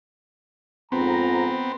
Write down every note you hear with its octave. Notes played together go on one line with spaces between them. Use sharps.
F2 G#2 B3 C4 A#5